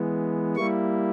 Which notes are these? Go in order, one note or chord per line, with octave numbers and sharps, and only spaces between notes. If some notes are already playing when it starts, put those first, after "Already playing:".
Already playing: E3 G#3 B3
G3 A#3 E4 C#6